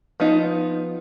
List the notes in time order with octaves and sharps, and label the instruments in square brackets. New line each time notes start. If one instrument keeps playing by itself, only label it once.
[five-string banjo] F3 B3 D#4